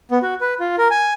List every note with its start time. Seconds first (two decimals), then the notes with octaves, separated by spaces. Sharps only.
0.11 B3
0.23 F#4
0.41 B4
0.60 F4
0.78 A#4
0.90 G#5